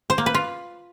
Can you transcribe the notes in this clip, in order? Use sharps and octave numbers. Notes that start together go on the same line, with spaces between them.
C5
A#3
B4
F4